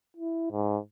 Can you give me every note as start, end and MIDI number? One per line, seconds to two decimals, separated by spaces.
0.17 0.50 64
0.51 0.78 44